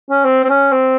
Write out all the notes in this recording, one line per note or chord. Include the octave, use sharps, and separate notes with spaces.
C#4
C4
C4
C#4
C4